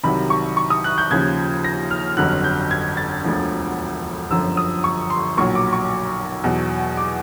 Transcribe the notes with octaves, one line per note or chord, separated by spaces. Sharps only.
C2 C3 D#3 F#3 B5
C#6
C#6
D#6
F#6
G6
D#2 C#3 F3 G#6
A#6
F6
G1 F2 D3 F#3 F#6
G6
G#6
A6
E1 D2 D3 F3
G1 F#2 D3 F3 E6
D#6
C#6
C6
B1 A#2 F#3 C#6
D6
C#6
E2 B2 F#3
D6